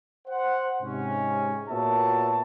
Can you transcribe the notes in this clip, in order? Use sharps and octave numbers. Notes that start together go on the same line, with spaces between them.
C5 F#5
G#2 C3 C#4
A#2 B3 F#4 C#5 E5 A5